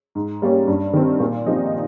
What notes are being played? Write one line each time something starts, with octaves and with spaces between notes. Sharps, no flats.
G#2
G3 A#3 C#4 G4
G2
D#3 G3 C4
A#2
F3 C4 D#4 G4